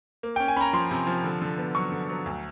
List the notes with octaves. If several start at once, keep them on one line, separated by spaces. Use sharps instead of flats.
A#3
G5
C#4
G#5
C#4 A#5 B5
F3 C6
C3
F3
D3
D3
B3
F#3 C#6
D3
F#3
D2